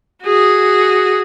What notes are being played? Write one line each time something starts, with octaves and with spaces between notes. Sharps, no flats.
F#4 G#4